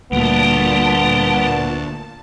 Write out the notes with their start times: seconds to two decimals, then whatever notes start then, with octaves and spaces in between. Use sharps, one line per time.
0.12 D2 A#2 G3 A#3 B3 A5